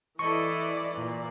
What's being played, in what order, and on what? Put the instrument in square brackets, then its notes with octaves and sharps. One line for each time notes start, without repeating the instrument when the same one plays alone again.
[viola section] E3 D5 [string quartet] E4 A4 D#5 [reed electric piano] C#6
[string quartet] A#2